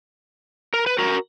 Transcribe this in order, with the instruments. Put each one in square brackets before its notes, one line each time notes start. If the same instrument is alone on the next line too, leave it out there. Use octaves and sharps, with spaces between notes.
[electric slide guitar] A#4
B4
F#4 A#4